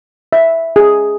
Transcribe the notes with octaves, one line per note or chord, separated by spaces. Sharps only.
E5
G#4